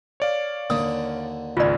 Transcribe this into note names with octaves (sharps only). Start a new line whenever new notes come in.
C#5 D5 F5
D#2 D3 D#6
G#1 C#2 F4 D5